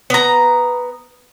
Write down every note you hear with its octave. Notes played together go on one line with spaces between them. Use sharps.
B3 A#5